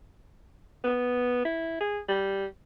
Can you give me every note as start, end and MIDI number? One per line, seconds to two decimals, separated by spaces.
0.84 1.44 59
1.45 1.76 64
1.81 1.99 68
2.09 2.46 55